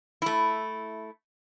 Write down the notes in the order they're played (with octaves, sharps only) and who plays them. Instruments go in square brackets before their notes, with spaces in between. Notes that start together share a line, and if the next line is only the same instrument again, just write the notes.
[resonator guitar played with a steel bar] A3 E4